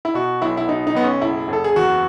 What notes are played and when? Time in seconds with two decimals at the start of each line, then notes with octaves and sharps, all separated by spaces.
0.05 E4
0.14 B2 F#4
0.42 B1 E4
0.57 E4
0.68 B2 D#4
0.87 D#4
0.95 B1 B3
1.04 C#4
1.21 F#1 E4
1.48 F#1 A4
1.64 G#4
1.76 E2 F#4